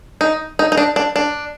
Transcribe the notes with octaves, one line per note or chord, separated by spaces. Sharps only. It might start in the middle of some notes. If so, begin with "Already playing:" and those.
D#4
D#4
D#4
D4
D4
D4